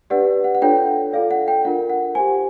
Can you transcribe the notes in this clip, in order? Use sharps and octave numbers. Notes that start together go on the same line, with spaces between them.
D4 G4 B4 D5 F#5
F#5
F#5
D4 F4 A4 C#5 G5
F4 A4 D5 F5
F#5
G5
D4 F4 A#4 F#5
F#5
G4 C5 G#5